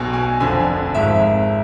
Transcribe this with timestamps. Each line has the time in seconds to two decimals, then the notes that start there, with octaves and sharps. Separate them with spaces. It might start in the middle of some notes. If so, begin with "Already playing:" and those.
Already playing: B1 B2 G#5
0.13 G#5
0.40 F1 F2 D3 F3 G#5
0.95 G#1 G#2 F3 E5